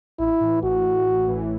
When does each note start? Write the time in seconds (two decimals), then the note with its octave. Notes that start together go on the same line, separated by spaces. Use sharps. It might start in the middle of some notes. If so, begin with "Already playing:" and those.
0.19 A1 E4
0.41 A2 E3
0.62 A1 F#4
0.84 A2 E3
1.05 A1
1.28 A2 E3